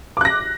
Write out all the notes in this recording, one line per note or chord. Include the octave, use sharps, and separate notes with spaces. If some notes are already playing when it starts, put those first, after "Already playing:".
D6 F#6 A#6